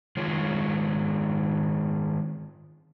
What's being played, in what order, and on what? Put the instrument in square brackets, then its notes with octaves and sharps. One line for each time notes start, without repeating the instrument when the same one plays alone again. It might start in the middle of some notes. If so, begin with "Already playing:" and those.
[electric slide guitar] D#3 G#3 F4 C#5